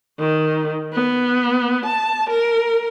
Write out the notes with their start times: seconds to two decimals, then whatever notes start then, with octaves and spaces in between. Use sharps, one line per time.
0.20 D#3
0.94 B3
1.85 A5
2.30 A#4